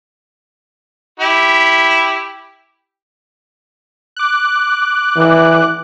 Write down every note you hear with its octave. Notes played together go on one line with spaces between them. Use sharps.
E4 G4
D6 F#6
E3